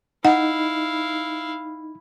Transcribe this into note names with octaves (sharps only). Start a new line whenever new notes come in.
D#4 E4 F5 F#5